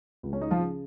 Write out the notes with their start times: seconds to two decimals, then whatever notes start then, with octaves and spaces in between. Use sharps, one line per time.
0.23 C#2 C#3
0.33 C#4
0.41 D#4
0.51 F3 F4
0.59 C#3